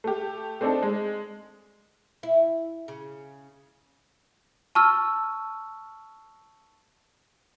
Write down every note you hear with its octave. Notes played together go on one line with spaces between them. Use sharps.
A3 G4
A3 C4 D4 D#4 A4
G#3
E4
C#3
A5 C#6 E6 F6